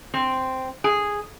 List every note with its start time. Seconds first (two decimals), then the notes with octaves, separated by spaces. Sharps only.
0.14 C4
0.84 G#4